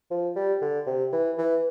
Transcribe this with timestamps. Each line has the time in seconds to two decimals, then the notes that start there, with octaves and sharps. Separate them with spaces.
0.11 F3
0.36 G3
0.62 D3
0.87 C3
1.13 E3
1.38 E3